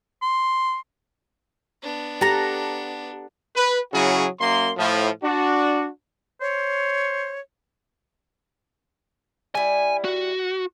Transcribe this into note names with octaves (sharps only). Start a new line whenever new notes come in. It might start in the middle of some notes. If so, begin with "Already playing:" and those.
C6
B3 D4
G4 A4 F#5 A#5
B4
C#3 F#3 E4 F#4 G#4
F#2 A#3 C6
A2 F3
D4 F#4
C5 C#5
G3 E4 G#5
F#4